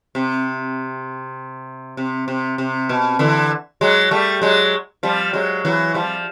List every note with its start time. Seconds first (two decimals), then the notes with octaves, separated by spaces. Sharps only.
0.15 C3
1.97 C3
2.28 C3
2.58 C3
2.89 B2
3.19 D3 E3
3.81 F#3 G#3
4.11 G3 A3
4.42 F#3 G#3
5.03 F3 G3
5.33 F#3 G#3
5.65 E3 F#3
5.94 F3 G3